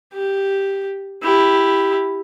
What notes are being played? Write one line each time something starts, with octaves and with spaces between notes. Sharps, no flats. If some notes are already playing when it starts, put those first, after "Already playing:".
G4
E4 G4